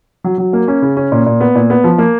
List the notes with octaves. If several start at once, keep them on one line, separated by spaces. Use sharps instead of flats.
F#3
F#3
A#3
C#4
C#3
C#4
A#2
A#2
B3
A#2
B3
F3
A#3